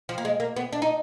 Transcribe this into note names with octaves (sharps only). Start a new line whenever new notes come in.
F3
A#3
G#3
A#3
B3
D4
D#4